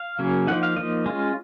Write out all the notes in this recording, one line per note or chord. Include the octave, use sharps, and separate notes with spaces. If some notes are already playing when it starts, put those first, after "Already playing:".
Already playing: F5
C#3 F#3 A#3 C#4
F3 A#3 D#4 F#5
F5
F3 A#3 D#4 D#5
G#3 C#4 F4